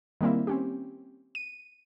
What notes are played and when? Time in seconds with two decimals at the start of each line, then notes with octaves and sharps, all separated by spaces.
0.21 D#3 G3 A#3 C4 E4
0.47 C4 C#4 G4
1.35 D#7